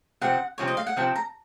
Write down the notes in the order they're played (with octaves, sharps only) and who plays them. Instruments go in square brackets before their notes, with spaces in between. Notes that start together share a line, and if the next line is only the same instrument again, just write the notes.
[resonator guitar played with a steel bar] C3 F3 C4 [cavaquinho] F#5
[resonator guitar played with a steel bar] C3 F3 C4 [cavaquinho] C#5
[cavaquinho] D#5
F5
F#5
[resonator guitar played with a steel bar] C3 F3 C4 [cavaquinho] A5
[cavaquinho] A#5